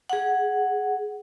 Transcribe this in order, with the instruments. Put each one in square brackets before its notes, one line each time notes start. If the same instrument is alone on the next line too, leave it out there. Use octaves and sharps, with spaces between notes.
[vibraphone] G#4 F#5